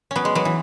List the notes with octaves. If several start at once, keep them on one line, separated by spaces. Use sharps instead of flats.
F#3 B3 C#4
G#3
F#3 B3
E3